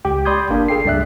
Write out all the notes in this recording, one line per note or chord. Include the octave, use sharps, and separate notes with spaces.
C#2 G4 G5
D5 B5 C6 D#6 G6 G#6
G1 A#3 D4 A#4
G#4 A4 G5 C7
C#2 G2 D5 E5 F#6